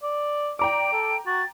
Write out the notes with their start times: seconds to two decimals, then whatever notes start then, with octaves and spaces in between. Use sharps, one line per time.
0.03 D5
0.59 D5 G5 A#5 D6 D7
0.93 A4
1.26 F#4 A6